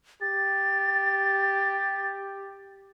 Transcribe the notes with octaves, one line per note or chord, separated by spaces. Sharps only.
G4 A6